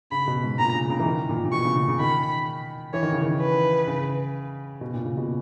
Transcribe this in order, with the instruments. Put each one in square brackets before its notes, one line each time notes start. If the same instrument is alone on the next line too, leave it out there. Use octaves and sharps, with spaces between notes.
[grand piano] C#3 [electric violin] B5
[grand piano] B2
G#2
[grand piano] A#2 [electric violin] A#5
[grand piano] C#3
C#3
E3
D#3
A#2
A#2
[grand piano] B2 [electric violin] C#6
[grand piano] C#3
C#3
C#3
[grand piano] D#3 [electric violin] B5
[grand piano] E3 [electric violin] C#5
[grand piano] D#3
C#3
D#3
[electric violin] B4
[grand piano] C#3
B2
A#2
C#3
B2